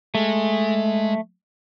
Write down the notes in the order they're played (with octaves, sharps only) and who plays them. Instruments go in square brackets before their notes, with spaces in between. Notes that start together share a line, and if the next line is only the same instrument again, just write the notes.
[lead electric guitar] G#3 [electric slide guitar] A3